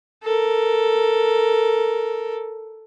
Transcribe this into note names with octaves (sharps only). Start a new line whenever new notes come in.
A4 A#4